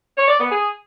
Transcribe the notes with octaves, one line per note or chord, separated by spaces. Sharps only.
C#5
D5
B3
G#4